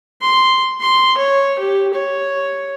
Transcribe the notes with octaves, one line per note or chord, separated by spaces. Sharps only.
C6
C6
C#5
G4
C#5